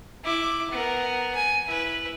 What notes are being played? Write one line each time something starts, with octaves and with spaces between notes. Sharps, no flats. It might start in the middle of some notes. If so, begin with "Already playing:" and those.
E4 D6
B3 A#4
G#5
E4 B4